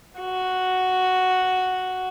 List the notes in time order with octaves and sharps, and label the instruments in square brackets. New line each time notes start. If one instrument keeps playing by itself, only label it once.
[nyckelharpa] F#4